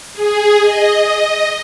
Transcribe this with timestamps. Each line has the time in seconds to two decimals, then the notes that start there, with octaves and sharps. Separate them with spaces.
0.13 G#4
0.61 D#5